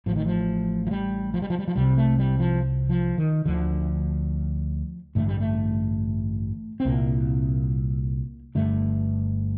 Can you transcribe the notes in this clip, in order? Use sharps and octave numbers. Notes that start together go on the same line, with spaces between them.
A1 A2 F3
D#3
F3
F3
G3
F3
G3
F3
G3
F3
C2 C3 G3
A3
G3
F3
F3
D#3
D2 D3 F3
A1 G2 D3 A3
G3
A3
C4
C2 A#2 A#3
G1 G2 D3 A3